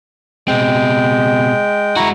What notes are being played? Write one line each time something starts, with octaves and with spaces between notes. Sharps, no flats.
B2 G#3 C4 G5
G#3 E4 F#4 A#5 C#6